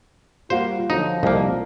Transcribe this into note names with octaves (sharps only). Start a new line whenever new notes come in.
G3 A#3 F4 F#4 C5
D3 F3 F#3 D#4
C2 A3 A#3 D#5 F5